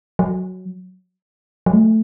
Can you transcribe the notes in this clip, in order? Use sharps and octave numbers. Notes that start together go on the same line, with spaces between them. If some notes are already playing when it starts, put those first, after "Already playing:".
F#3
F#3
A3